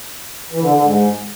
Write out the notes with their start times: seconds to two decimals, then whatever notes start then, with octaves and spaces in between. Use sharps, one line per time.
0.52 E3
0.62 D3
0.72 D3
0.82 G#2